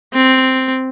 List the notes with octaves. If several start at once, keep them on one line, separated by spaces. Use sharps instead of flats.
C4